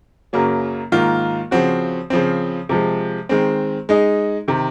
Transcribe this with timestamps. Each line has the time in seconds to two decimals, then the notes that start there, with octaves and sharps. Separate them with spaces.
0.33 F#2 C#3 F#3 A#3
0.92 G#2 D#3 A#3 F4
1.51 C#3 F3 C4 F#4
2.10 C#3 F3 C4
2.69 C3 F3 G#3
3.29 D#3 G#3 C4
3.89 G#3 D#4 G#4
4.48 C3 D#3